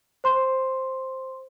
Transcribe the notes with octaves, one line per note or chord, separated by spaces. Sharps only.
C5 C6